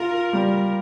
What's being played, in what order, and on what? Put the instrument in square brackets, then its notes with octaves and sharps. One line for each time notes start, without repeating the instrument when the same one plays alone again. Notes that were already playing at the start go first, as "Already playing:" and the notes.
Already playing: [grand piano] F4 [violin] A#4
[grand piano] G3